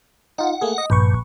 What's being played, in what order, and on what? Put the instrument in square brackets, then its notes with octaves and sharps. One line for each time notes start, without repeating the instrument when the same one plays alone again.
[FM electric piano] D#4 F4 [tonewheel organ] F#5
[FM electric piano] A3 A#3 G#4
D#5
[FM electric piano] A#1 B4 C#6 [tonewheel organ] G2